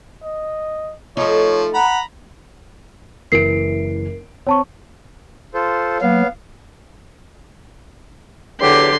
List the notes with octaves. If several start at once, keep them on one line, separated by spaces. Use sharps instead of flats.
D#5
F3 A3 D#4 C#5
F#5 A#5 B5
F#1 E3 A#4 C7 D7
C4 C#5 A5 C#6
F4 A4 C5
F#3 A#3 B3 F5
E2 D3 F#3 G4 C6